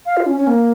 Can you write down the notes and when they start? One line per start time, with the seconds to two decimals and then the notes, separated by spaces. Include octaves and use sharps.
0.06 F5
0.17 F4
0.26 C#4
0.37 C#4
0.47 A#3